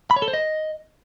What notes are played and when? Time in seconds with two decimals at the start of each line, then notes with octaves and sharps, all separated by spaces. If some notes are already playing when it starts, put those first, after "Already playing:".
0.11 B5
0.16 C#5
0.22 A4
0.28 C5
0.34 D#5